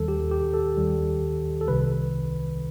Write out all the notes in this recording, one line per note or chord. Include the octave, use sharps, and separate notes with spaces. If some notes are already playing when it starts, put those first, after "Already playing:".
Already playing: D#2 D#3 G3 A4
G4
G4
A4
D#2 D#3 G3
A4
C2 C3 D#3 G3 B4